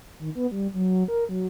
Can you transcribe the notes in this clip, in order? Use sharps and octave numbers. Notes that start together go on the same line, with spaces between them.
D#3
B3
G3
F#3
A#4
F#3